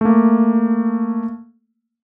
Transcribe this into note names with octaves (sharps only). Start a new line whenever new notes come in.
A3 A#3